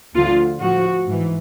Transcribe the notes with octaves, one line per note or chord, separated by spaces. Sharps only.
D2 D3 F3 F4
A2 F3 F#4
G#2 E3